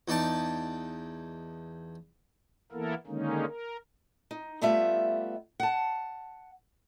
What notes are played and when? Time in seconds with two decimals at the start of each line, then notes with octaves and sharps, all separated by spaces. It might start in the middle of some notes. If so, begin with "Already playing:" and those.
0.08 E2 D#4 D5 A5
2.72 E3 A#3 B3 E4 A4 A#4
3.07 D3 D#3 G#3 A#3 C#4 D#4
3.47 A#4
4.31 D#4
4.61 G3 A3 B3 F4 G4 E5
5.60 F#5 A5